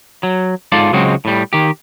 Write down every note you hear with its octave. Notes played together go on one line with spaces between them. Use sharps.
F#3
G#2 F4 A4 D5
C#2 F#3 G#3 C4 F#4
A2 G3
D#3 G4